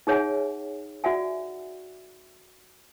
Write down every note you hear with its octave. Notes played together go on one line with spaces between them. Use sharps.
D#4 G#4 C#5 E5 F#5 G#5
F#4 D5 E5 F#5 G#5